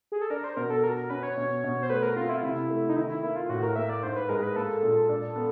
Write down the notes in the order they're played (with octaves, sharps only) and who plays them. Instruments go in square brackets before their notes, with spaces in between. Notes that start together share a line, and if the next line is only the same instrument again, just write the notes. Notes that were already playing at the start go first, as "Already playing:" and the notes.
[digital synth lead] G#4
A4
[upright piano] D4 [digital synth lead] A#4
[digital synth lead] C5
[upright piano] B2 [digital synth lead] A#4
[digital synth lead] A4
[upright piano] F#4 [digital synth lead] A#4
[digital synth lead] A#4
[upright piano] C#4 [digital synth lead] B4
[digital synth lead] C#5
[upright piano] B2
B2
[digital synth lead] C5
[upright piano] A3 [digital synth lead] B4
[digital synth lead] A#4
[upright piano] C4 [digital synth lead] F4
[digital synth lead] E4
F4
[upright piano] C3 [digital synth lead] E4
[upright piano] A3
[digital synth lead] D#4
[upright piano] D#3 [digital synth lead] E4
[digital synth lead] E4
[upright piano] A#3 [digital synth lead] E4
[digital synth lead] F4
[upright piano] A2 [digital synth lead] F#4
[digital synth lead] A#4
[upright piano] A#3 [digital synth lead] E5
[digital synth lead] D5
[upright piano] G#2 [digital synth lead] C5
[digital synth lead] B4
[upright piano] G#3 [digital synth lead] A#4
[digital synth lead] B4
[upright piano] A#3 [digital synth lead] A4
[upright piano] A#2
D4
B3